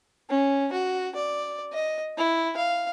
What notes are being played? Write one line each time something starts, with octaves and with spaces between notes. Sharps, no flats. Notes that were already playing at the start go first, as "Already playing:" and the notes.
C#4
F#4
D5
D#5
E4
F5